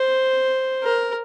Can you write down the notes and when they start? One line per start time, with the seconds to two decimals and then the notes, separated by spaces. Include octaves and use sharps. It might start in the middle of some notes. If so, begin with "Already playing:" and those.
Already playing: C5
0.83 A#4